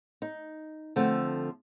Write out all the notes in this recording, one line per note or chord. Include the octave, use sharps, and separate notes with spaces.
D#4
D3 F3 A3 C4